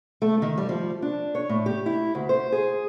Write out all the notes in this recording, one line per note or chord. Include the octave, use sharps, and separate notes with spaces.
A3
D#3
G3
F3
D4
C#5
A2
G4
E4
D2
C5
G#4